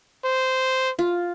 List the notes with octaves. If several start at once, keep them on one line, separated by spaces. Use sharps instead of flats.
C5
F4